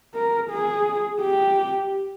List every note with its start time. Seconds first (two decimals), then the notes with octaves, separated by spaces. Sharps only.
0.14 A#4
0.50 G#4
1.21 G4